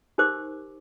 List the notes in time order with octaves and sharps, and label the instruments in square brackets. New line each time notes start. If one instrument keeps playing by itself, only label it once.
[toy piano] D#4 G4 A#4 C5 D6